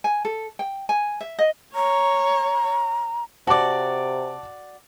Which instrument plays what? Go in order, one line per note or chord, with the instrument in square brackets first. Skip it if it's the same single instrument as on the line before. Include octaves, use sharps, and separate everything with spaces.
[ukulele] G#5
A4
G5
G#5
E5
D#5
[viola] C#5 [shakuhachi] A#5
[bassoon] C3 [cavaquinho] F#4 D5 [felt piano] A5 D6